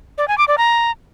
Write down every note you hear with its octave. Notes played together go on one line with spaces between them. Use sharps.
D5
G#5
D6
D5
A#5